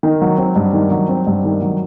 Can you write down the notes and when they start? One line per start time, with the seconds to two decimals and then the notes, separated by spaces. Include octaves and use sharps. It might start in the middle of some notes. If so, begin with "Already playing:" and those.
0.03 D#3
0.21 F#3
0.38 C4
0.56 G2
0.73 D#3
0.91 F#3
1.09 C4
1.27 G2
1.44 D#3
1.62 F#3